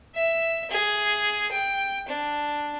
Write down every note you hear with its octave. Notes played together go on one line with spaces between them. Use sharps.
E5
G#4
G5
D4